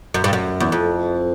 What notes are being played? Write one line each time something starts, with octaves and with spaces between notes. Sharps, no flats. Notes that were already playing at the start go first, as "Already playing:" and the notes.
F#2
G2
F#2
E2
F2